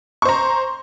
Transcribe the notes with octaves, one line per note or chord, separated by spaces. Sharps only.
C5 A#5 C#6